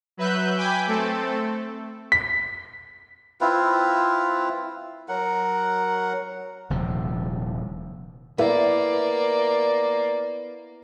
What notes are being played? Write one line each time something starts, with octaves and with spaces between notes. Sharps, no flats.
F#3 B4 E5 F#6 G6
G5 G#5 B5 D6 G6
A3 C4 A4
B6
C4 E4 F4 B4
F#3 A#4 F#5
D#1 C3 F3
A#3 B3 E4 A#4 D5 E5